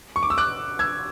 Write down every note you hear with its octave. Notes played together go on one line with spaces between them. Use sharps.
C#6
D6
E6
D6 F#6
E6 G#6